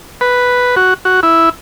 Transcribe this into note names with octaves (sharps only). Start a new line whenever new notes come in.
B4
F#4
F#4
E4